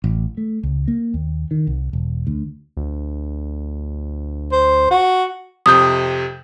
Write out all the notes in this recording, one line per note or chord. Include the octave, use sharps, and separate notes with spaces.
A1
A3
C#2
A#3
D#2
D#3
C2
E1
D2
D2
C5
F#4
F2 C3 D#6 G6